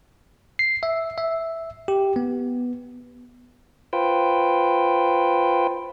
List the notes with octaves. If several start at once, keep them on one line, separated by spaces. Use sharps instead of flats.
C7
E5
E5
G4
B3
F4 B4 C5 G5